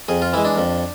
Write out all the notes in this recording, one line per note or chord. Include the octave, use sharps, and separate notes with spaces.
F2 G#4
F4
E3 G#3 E4
D4
F2